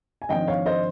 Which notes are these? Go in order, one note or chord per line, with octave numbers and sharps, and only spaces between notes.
G#5
G#1 G2 F3 D#5 G5
C#5 F5
C5 D#5